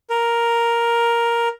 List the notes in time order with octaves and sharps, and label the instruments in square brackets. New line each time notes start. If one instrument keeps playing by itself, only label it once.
[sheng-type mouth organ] A#4